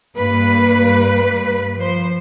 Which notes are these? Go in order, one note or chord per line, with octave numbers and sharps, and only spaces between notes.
G2 A#3 B4
F3 C5